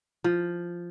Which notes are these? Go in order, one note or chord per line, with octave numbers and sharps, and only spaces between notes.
F3